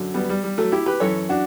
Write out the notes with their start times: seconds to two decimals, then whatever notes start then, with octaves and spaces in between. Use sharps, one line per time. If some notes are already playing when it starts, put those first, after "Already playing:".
Already playing: F#2 D3 F#3
0.14 G3 B3
0.29 G3
0.43 G3
0.58 F#3 A3
0.72 E4 G4
0.86 G4 B4
1.00 F#2 E3 A4 C#5
1.29 D4 F#4